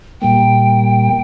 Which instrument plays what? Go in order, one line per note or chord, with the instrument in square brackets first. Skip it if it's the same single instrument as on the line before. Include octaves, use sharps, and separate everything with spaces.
[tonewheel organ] A#2 G3 A#3 [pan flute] G5